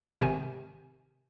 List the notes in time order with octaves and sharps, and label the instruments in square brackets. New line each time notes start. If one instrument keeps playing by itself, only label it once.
[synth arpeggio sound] G#1 C3 D#3 G#5